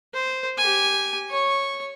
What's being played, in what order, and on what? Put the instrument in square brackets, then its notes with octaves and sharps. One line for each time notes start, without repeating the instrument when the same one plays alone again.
[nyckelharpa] C5
G4 G#5
C#5 C#6